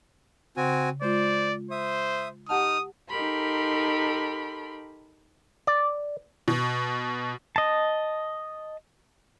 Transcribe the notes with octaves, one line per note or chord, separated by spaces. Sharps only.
C#3 C4 F#4 G#5
G#3 F4 C5 D5
C5 E5 D#6
D#4 G4 F#5 A5 D#6 F6
D#4 G4 A4 A#4 B5 C6
D5
B2
D#5 A5